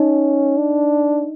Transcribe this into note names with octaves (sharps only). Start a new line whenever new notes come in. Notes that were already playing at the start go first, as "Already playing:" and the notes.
Already playing: C#4 D#4 D#5
D4